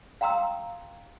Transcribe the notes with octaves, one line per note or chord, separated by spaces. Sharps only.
F5 G5 A#5 C6 D#6 E6